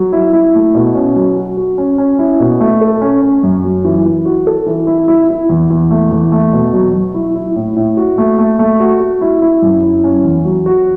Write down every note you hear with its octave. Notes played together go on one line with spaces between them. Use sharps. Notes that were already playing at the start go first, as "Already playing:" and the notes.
Already playing: F#3
E4
E4
A3
B2
C#4
F#3
F#4
F#4
C#4
C#4
E4
B2
A3
A4
C#4
C#4
F#2
F#3
E3
E3
F#4
A4
E3
E4
E4
E4
E2
E2
A3
E2
A3
B2
F#3
F#3
E4
E4
A2
A2
F#4
A3
A3
A3
F#4
F#4
E4
E4
F#2
E4
C#4
E2
F#3
F#4